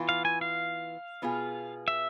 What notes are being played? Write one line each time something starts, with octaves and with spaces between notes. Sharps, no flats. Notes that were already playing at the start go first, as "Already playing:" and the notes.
Already playing: E3 B3 F4
F5
G#5
F5
B2 B3 F4 G#4
E5